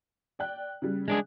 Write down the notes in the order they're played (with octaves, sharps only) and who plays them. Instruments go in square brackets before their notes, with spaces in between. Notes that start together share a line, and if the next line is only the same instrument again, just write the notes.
[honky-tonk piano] D5 G5 F#6
C#3 G3
[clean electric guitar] G#3 D4 G#4